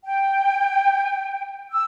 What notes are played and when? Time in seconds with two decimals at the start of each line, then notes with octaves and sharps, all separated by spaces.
0.04 G5
1.72 E6